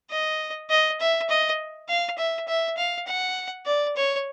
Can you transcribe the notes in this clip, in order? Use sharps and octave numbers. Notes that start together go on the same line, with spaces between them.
D#5
D#5
E5
D#5
F5
E5
E5
F5
F#5
D5
C#5